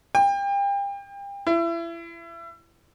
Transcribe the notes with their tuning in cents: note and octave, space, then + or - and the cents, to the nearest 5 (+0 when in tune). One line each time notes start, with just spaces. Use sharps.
G5 +30
E4 +30